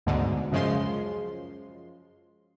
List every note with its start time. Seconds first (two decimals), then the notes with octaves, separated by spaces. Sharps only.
0.06 D2 G#2 B2 D3
0.51 F#2 C#3 F3 G#3 C6